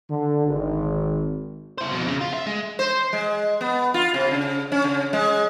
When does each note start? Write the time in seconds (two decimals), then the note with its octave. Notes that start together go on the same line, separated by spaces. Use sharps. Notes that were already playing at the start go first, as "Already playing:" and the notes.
0.10 D3
0.46 G#1
1.78 E4 C5
1.91 F2 B2
2.08 C#3
2.21 F4
2.34 E5
2.47 G#3
2.79 C5
3.13 G#3
3.61 B3
3.94 F4
4.14 C3
4.31 C#3
4.72 C#4
4.84 C#3
5.13 G#3